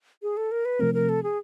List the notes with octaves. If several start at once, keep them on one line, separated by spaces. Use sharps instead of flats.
G#4
A4
A#4
B4
C3 F3 A3 C4 A#4
A#4
A4
G#4